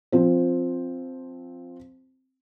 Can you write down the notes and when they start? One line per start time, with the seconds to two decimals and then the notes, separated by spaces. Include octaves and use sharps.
0.12 F3 C4